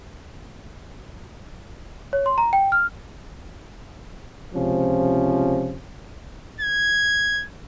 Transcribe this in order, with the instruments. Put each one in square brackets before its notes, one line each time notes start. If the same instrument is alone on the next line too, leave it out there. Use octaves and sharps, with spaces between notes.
[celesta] C#5
C6
A#5
G5
F6
[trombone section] C#2 C3 F3 C#4
[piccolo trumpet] G#6